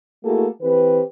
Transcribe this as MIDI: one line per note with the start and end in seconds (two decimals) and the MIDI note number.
0.24 0.47 57
0.24 0.47 58
0.24 0.47 64
0.24 0.47 66
0.24 0.47 68
0.24 0.47 69
0.62 1.02 52
0.62 1.02 60
0.62 1.02 67
0.62 1.02 71